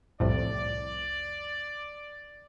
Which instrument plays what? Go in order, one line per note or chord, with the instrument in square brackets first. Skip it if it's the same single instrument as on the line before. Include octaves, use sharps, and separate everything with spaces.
[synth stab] C2 F2 A2 [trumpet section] D5